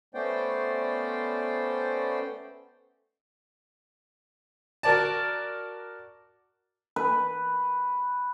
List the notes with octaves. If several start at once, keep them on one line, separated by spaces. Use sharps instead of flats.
A3 B3 C#4 C5 D5 G5
F#4 A#4 D5 A5
B4